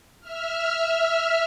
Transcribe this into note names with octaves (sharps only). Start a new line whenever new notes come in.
E5 F6